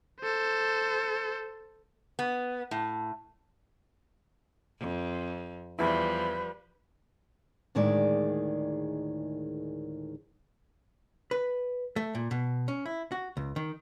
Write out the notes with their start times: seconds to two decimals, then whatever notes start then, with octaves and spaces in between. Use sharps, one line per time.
0.20 A4 C5
2.19 B3
2.71 A2
4.79 F2
5.79 E2 F3 G3 E4 B4
7.75 D2 A2 D#3 G#3 G#4 D5
11.31 B4
11.96 A3
12.15 A#2
12.31 B2
12.68 C#4
12.86 E4
13.12 F#4
13.37 C#2
13.56 D#3